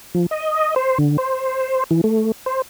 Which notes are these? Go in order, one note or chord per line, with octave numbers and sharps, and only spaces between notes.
F3
D#5
C5
D3
C5
E3
A3
C5